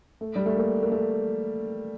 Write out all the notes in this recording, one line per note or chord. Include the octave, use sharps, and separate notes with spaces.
A3
G3
A3
A#3
A#3
A3